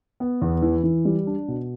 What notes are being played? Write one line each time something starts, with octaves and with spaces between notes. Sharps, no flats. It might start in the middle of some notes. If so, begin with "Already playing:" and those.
B3
E2
E3
E3
G3
D4
B2